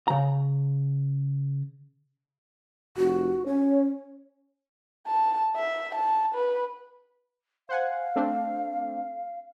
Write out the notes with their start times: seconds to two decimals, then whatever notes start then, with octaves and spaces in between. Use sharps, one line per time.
0.08 C#3 A#5
2.97 F1 F#4
3.47 C#4 C#5
5.07 A5
5.56 E5
5.95 A5
6.35 B4
7.69 C5 F5 F#5 G#5
8.16 A3 C4 D4